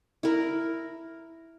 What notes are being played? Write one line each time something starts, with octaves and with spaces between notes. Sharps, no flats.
E4 A#4